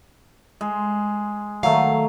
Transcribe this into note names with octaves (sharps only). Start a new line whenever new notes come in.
G#3
D#3 F#3 A3 F5